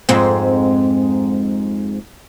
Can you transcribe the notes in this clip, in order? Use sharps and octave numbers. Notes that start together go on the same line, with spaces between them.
F2 G#2 C4